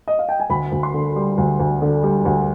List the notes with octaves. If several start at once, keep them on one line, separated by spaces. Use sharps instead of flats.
D#5
F5
G5
G#5
D2 B5
D2
C6
D3
G3
D2
D2
D3
G3
D2